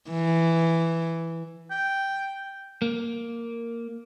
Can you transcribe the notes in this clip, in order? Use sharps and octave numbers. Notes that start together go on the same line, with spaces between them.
E3
G5
A#3